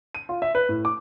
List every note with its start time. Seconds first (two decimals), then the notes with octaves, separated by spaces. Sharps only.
0.15 D#7
0.29 F4
0.42 E5
0.55 B4
0.69 A2
0.85 D6